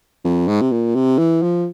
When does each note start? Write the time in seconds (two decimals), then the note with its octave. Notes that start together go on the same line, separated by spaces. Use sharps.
0.25 F2
0.48 G#2
0.61 C3
0.72 A#2
0.95 C3
1.18 E3
1.43 F3